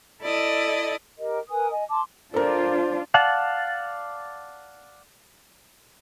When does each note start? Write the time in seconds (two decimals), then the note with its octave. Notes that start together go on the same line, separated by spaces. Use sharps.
0.21 E4 A4 D5 D#5
1.17 G4 A#4 D#5
1.49 A#4 B4 G#5 D#6
1.70 D#5 G#5
1.89 A5 C6 D6
2.34 D4 F4 A4 A#4 C5
3.14 D5 F5 F#5 A5